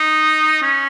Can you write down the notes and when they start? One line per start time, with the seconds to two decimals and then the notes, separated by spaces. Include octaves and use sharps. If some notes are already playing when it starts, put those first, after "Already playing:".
Already playing: D#4
0.62 C#4